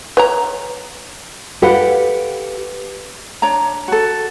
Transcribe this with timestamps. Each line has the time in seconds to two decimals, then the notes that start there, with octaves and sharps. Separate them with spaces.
0.17 B4 C#5 A#5
1.62 G4 A4 B4 F5 F#5
3.42 D4 C#5 A#5
3.88 F#4 A4